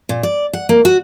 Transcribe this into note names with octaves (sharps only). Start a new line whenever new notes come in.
A#2
D5
F#5
A#3
F#4